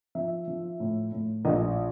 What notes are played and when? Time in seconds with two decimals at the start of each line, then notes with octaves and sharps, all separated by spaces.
0.15 F3 E5
0.48 F3
0.80 A2
1.12 A2
1.45 A#1 D#5